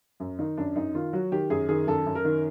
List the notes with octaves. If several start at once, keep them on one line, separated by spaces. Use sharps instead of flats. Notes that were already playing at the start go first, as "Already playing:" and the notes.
F#2
D#3 D#4
F#2 D4
F#2 D#4
D#3 F4
F#3 F#4
D#3 G4
F#2 G#4
D#3 G#4
F#2 A4
F#2
A#4
D#3